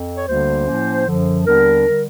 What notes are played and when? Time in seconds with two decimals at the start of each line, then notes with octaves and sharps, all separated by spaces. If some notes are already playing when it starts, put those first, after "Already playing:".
Already playing: F2 C4
0.14 C#5
0.26 D2 D3 G3 A#3 D4 C5
0.66 A2 F3 A#3 C#4
1.07 F#2 D3 F3
1.46 D#2 D3 G3 B3 D4 A#4
1.87 D3 G3